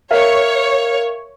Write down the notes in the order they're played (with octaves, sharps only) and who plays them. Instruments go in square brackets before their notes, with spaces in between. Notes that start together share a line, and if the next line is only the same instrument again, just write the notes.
[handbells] A#4 E5 F5 [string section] C#5